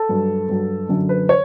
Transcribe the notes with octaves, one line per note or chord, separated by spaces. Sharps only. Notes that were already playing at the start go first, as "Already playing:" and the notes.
Already playing: A4
G2 F#3
G2 F#3
F#2 D3 F#3
B4
C#5